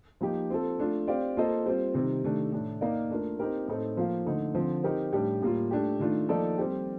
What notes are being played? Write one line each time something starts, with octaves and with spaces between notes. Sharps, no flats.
F3 A#3 D#4 G4
C4 F4 A4
A3 D4 F4
C4 G4 D5 F5
A#3 F4 A4 C5 D#5
G3 C4 F4 C5
C3 D#3 G3 C4
C3 D#3 A3 D4
A2 A3 D4
A#3 D#4 A#4 D5 F5
A3 D4 F4 A#4
C4 D#4 G4 A#4
A2 A3 C4 D#4 A4
F3 A#3 F4 C5 F5
D3 A3 D#4
D3 F3 C4
C4 D#4 G4 A#4
A2 G3 D4 G4
A2 G3 A#3 F4
A3 D4 G4
D#3 A3 D4 F4
F3 A#3 D#4 A4 D5
G3 C4 G4